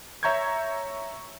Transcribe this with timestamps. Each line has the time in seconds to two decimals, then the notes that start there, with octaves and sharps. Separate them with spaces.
0.23 C#5 E5 A#5 C#6 G6 G#6